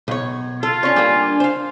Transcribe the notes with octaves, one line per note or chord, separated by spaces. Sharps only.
B1 C#5
F4 A4
C#4 D4 C#5 G#5
G3 A#3
C5 F5